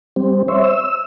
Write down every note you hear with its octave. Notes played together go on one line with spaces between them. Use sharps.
G3 C4
C5 C#5 E5
E6